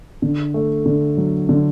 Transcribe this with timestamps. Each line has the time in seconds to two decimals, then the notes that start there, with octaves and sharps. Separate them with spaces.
0.22 D3
0.54 A3
0.86 D3
1.17 F#3
1.49 D3